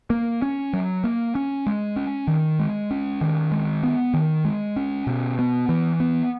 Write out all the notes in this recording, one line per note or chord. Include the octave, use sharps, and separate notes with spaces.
A#3
C#4
F#3
A#3
C#4
G#3
C#4
D#3
G#3
C#4
D#3
G#3
B3
D#3
G#3
C#4
B2
B3
E3
B3